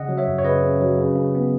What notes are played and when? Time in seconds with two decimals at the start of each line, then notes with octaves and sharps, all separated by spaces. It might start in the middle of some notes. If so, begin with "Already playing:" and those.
Already playing: C#3 D#5 F#5
0.08 F#3
0.18 C#5 E5
0.28 F#2
0.38 C#5
0.44 C#3 B4 D#5
0.63 C#3
0.81 F#3
0.99 C#3
1.16 C#3
1.35 B3